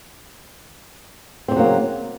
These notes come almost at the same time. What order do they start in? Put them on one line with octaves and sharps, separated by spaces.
C4 A#2 C#3 F#3 A#3